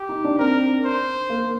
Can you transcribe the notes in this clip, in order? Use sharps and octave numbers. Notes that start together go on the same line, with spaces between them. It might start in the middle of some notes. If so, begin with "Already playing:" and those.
Already playing: G4
D#4
D4
C4 A#4
C5
A#3